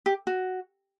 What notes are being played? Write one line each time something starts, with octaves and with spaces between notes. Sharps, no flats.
G4
F#4